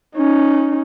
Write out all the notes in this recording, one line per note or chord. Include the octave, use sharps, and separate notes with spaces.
C#4 D#4